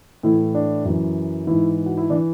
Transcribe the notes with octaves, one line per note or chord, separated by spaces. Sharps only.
A2 E3 E4
D4
F#2 E3
G#2 E3 E4
F#4
E4
E3 D4